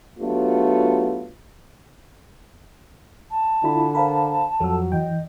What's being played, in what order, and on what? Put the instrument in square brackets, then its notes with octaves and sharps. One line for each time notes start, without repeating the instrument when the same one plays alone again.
[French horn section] F#3 A3 B3 D4 F4 G4
[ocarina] A5
[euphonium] D3 [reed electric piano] E4 F4 B5
[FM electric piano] A#4 [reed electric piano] C5 F5 B5
[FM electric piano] F2 F3 [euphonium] F#3 [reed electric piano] A4 E6
[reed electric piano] F#2 E3 [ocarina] D#5 [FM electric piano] G5